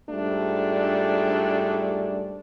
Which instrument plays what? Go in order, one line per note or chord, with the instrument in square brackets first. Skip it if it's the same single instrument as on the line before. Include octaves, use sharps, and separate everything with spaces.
[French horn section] G#2 G3 A3 D4 F4